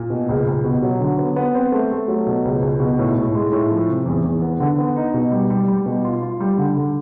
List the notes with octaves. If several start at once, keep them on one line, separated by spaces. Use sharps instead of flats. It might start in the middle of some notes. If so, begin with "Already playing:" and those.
Already playing: A#2
B2
C#2
C#2
B2
F#3
D3
B3
B3
C4
A3
A3
F#3
B2
C#2
C#2
B2
A2
A2
G#3
A2
F3
C3
E2
E2
B3
D3
B3
D#4
B2
G3
G3
G3
B2
F4
F4
G3
D3
D3